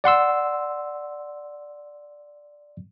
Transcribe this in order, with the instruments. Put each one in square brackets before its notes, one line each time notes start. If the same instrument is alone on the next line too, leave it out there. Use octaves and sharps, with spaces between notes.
[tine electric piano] D5 F#5 C6 E6